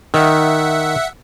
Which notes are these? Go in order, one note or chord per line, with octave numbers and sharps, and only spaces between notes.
D#3 E5 F#5